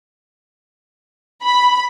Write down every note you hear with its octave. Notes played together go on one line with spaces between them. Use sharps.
B5